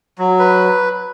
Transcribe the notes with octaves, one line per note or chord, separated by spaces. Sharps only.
F#3
B4